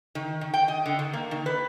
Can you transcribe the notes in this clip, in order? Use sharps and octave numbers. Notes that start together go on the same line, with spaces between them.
D#3
D#3
G5
D#5
D3
D#3
A#3
D#3
B4